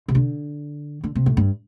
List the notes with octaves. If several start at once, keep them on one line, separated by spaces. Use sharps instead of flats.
C3
D3
D3
C3
A2
G2